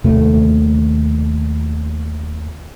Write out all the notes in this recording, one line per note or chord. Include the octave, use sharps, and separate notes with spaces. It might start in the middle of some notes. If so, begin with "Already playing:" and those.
D#2 C3 D#3 A3